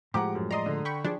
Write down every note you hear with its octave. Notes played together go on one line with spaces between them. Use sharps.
A2 F3 G#3 G4 F#5 A#5 D6
F#2
D5 D#5 A#5 C6 D#6
D3
G5 B5 C#6
F3 D4 G4 G#4